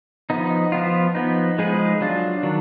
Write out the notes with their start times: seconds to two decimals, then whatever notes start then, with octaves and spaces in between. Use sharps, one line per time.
0.30 F3 B3 D#4
0.72 F3 B3 F4
1.15 F3 B3 D#4
1.58 F3 G#3 D#4 G#4 B4
2.01 F#3 D4 F4
2.43 D#3 F#3 D4